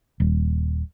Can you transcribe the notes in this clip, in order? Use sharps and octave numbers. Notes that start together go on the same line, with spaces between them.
D#1